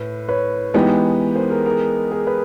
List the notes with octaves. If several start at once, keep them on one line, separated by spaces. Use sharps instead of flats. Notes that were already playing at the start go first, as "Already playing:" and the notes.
Already playing: A2 B4
B4 C#5
E3 G#3 B3 D#4 G4
A#4 C5
G#4 A#4
G#4 A#4
G#4 A#4
B4